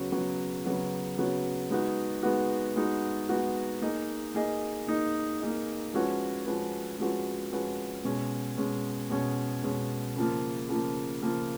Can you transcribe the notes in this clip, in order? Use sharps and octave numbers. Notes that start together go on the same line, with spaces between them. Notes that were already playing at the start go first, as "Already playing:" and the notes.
Already playing: C#3 F#3 B3 F#4 C#5
C#3 F#3 B3 F#4 C#5
C#3 F#3 B3 F#4 C#5
C#3 F#3 B3 F#4 C#5
G#3 B3 D#4 F#4
G#3 B3 D#4 F#4
G#3 B3 D#4 F#4
G#3 B3 D#4 F#4
A#3 D#4 G#4 D#5
A#3 D#4 G#4 D#5
A#3 D#4 G#4 D#5
A#3 D#4 G#4 D#5
F3 G#3 C#4 F#4 B4
F3 G#3 C#4 F#4 B4
F3 G#3 C#4 F#4 B4
F3 G#3 C#4 F#4 B4
B2 G#3 C#4
B2 G#3 C#4
B2 G#3 C#4
B2 G#3 C#4
C#3 F3 A#3
C#3 F3 A#3
C#3 F3 A#3